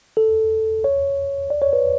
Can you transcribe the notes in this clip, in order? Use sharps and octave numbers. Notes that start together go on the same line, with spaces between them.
A4
C#5
D5
C#5
B4